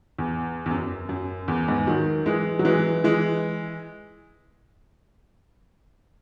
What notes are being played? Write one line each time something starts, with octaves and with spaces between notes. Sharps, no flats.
E2
E2
F#2
F#2
E2
E2 G#2
D#3 F#3
E3 G#3
F#3
E3 G#3
E3 G#3